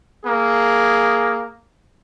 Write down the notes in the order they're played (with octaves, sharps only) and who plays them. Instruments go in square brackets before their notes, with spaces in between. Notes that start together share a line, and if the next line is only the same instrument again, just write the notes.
[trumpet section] A#3 G#4